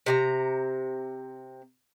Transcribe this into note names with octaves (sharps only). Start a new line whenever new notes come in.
C3 G#4 A#5